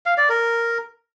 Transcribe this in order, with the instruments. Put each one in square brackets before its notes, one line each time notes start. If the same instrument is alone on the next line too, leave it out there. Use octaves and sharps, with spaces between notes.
[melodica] F5
D5
A#4